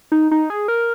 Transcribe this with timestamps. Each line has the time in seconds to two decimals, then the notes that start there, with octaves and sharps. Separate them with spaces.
0.12 D#4
0.31 D#4
0.50 G#4
0.68 A#4